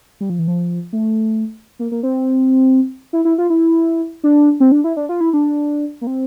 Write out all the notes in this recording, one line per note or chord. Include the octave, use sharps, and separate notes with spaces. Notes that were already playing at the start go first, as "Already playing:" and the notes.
G3
F3
E3
F3
A3
A#3
A#3
C4
E4
E4
F4
E4
D4
C4
D4
E4
D4
F4
E4
D4
A#3
C4